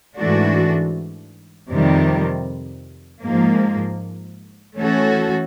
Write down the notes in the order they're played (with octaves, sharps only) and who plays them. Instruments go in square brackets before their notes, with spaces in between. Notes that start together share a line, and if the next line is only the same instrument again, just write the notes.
[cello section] G#2 E3 A3 D4 F#4
F2 C3 D#3 G3
G#2 F3 A#3
E3 A3 C#4 F#4 A4